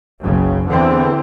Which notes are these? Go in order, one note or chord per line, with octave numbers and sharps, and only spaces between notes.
F#1 B1 C#3
E2 D3 E3 C4